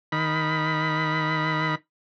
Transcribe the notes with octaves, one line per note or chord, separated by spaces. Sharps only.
D#3 B5